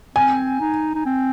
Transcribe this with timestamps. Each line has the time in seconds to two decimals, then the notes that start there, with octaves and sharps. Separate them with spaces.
0.15 C4 G#5
0.61 D#4
0.95 D#4
1.06 C4